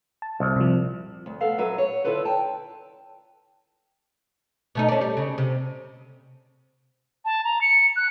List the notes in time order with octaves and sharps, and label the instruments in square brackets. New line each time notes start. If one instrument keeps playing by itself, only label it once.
[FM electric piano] A5
[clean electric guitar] C2
[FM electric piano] C3 F3
[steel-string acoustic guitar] D2
B3 A4 F5
F#3 B4 E5
C#5
D3 E4 F4 A4 B4
G5 A5
[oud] B2 A3 D#4
C#4 D4
G3
C#3
C3
[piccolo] A5
A#5
C#7
F#6